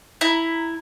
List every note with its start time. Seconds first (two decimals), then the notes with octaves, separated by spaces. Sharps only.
0.21 E4 A#5